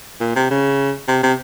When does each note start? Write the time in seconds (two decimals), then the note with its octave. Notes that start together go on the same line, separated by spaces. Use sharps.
0.21 A#2
0.36 C3
0.50 C#3
1.08 C3
1.23 C3